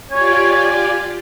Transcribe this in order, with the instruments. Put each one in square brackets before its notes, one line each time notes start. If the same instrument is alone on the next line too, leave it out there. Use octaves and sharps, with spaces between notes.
[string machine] F4 G4 D5 [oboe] C#5 [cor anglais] G#5